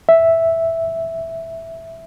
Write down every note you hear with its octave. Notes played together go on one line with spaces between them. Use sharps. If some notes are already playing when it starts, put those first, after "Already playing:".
E5